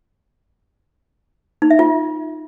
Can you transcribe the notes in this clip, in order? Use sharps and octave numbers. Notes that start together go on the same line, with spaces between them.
D#4
E5
F4